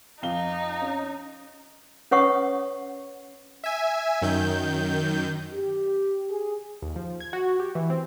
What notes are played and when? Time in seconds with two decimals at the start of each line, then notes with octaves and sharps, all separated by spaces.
0.22 F2 D#4 F5 G7
0.82 C#4
2.11 C#4 B4 C#5 F#5 C#6 D#6
3.64 E5 G#5
4.22 F#2 D#3 G6
5.53 G4
6.30 G#4
6.82 D#2
6.96 F3
7.20 G#6
7.33 F#4
7.60 G4
7.75 E3
7.90 C4